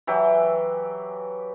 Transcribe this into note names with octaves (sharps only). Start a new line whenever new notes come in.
E3 F#3 G4